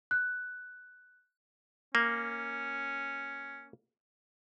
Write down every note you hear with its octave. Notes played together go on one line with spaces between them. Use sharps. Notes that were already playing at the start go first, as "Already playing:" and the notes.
F#6
A#3 C#4